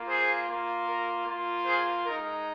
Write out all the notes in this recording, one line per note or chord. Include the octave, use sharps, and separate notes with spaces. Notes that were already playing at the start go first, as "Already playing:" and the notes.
Already playing: A#3 F4
G#4 C5
A#3 F4
A#4
A#3 F4
G#4 C5
G#3 D#4 A#4